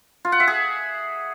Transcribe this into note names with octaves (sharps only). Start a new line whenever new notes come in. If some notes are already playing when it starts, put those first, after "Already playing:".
F4
F#5
E5
G#4